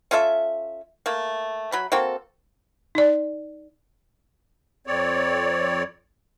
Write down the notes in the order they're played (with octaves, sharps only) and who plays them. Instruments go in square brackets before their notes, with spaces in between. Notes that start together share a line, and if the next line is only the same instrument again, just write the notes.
[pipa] C#4 F4 A4 E5
A3 A#3
F#3 B5
A#3 C4 F#4 A4
[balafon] D#4 D5
[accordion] F2 C4 C#5 D5